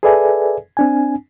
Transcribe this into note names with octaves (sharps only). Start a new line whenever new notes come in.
G#4 A4 B4 D5 E5 G#5
C4 D4 G#5